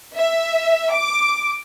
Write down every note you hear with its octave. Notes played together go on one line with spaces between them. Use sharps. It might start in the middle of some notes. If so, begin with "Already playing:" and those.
E5
D6